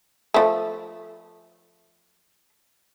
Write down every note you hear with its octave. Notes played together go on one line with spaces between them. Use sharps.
F3 A3